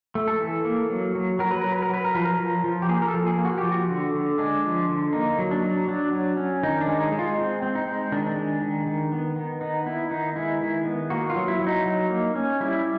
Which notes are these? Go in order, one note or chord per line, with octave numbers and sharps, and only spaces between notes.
A3
A4
E3
A#3
F#3
F#3
F#3 A#4
B4
F#3 A#4
B4
A#4
F#3 B4
A#4
F3 B4
A#4
F3
F3
G4
A#3 G#4
A#4
A4
F3
G#4
A#3
F#4
G4
F3
F#4
D3
D3
G#3 D4
F3
D3
A#3 D#4
F#3
D4
F#3
F#3 D4
F#3
C#4
D#3 D#4
D4
G#3
D#4
G#3
F4
C4
C4
D#4
G#3
D#3 D4
D4
G#3
D#3
D#3
B3
D#3
B3 D#4
B3 E4
D#3 D#4
G#3 E4
D#3
B3
A#3 F#4
F4
F#3
E4
F#3
D#4
F#3
A#3
C#4
G3 E4